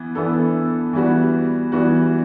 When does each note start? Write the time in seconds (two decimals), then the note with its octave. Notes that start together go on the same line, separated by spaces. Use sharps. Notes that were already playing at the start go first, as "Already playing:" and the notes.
Already playing: E3 B3
0.15 E3 B3 D4 A4
0.93 E3 G3 B3 F#4
1.72 E3 G3 B3 F#4